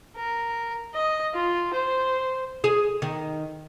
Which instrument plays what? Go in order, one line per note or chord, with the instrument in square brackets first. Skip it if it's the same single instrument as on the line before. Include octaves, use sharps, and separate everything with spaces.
[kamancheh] A#4
D#5
F4
C5
[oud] G#4
D#3